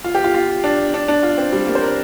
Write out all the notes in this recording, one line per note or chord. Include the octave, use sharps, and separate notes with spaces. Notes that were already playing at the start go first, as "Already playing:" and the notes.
F4
G4
F4
F4
D4
D4
D4
F4
C4
G3
A#3
C5
A#4